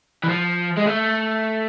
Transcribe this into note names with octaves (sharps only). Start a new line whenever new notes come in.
E3
F3
G#3
A3